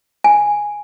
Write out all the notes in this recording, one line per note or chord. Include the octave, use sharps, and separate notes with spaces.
G#5